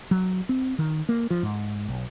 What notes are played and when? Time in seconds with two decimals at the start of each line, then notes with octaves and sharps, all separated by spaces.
0.11 F#3
0.49 C4
0.78 D#3
1.09 A#3
1.30 F3
1.43 G#2
1.88 B1